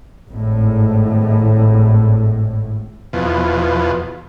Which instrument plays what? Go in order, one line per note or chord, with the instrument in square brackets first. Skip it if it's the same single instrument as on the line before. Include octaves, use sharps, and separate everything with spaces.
[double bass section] G#1 A2
[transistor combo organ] E2 B2 F3